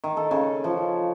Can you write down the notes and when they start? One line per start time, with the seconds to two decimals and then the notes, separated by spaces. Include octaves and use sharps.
0.04 D#3
0.17 A4
0.31 C#3
0.64 F3